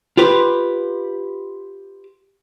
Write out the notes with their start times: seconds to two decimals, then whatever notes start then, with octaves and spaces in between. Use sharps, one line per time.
0.17 F4 G4 B4 C5